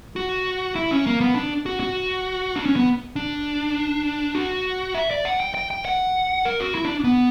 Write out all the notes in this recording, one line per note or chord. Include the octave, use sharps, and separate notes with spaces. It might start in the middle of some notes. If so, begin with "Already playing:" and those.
F#4
E4
C#4
A#3
B3
D4
F#4
F#4
D4
C#4
B3
D4
F#4
E5
D5
F#5
G5
G5
G5
F#5
A#4
F#4
E4
D4
B3